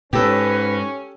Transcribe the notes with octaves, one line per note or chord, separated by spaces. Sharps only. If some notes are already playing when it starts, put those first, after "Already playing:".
G#2 C#4 G4 A4 B4